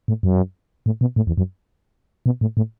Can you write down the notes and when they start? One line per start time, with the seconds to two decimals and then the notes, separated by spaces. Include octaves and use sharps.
0.08 A2
0.23 F#2
0.86 A2
1.01 B2
1.16 A2
1.27 E2
1.38 F#2
2.26 B2
2.41 A2
2.57 A2